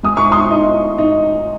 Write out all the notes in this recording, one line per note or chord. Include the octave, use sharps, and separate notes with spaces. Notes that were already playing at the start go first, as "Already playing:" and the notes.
G#3 D#6
C#6
C6 D#6
D#4
D#4